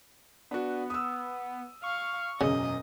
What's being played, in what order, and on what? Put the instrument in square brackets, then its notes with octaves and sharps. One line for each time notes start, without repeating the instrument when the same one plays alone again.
[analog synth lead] B3 [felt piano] D4 F#4
[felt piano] D#6 E6
[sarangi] F5 [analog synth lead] C#6
[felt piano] E1 F#2 [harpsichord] C#3 [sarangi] D#5